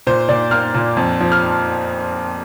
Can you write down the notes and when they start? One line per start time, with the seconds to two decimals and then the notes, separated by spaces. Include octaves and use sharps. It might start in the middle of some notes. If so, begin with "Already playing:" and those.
0.07 A#2 C5
0.29 A#2 D5
0.51 A#3 F6
0.74 A#2
0.97 F2
1.21 F3
1.32 F6